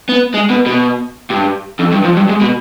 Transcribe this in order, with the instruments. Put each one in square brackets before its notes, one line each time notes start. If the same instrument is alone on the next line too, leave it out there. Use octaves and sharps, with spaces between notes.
[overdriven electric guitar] B3
G#3
B2
B2
G2
F2
G2
F2
G2
G#2
B2